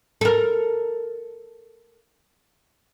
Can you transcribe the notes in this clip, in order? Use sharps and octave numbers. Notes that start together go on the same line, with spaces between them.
A4 A#4